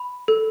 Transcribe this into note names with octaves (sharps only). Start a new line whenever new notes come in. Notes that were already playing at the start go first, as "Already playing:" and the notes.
Already playing: B5
A4